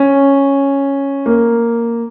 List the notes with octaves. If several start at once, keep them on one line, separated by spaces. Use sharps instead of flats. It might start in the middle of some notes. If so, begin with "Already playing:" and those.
Already playing: C#4
A#3